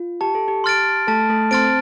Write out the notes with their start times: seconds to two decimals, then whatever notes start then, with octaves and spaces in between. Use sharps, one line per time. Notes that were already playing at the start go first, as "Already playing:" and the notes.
Already playing: F4
0.21 G4 A5
0.35 A4
0.48 G4
0.64 C6 F6 A6 D7
1.07 A3 A4 A5
1.29 A3 A4
1.51 C4 C5 C6 F6 A6 D7